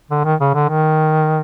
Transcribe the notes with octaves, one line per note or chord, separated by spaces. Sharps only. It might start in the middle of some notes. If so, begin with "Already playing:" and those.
D3
D#3
C#3
D3
D#3